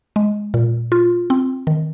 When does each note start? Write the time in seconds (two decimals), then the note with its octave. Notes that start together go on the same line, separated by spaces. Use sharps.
0.16 G#3
0.54 A#2
0.92 F4
1.30 C4
1.67 D#3